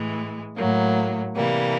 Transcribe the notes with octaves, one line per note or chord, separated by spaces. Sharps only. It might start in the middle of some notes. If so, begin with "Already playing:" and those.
Already playing: A2 E3 G#3
A2 F#3 A#3
C3 E3 G3 A#3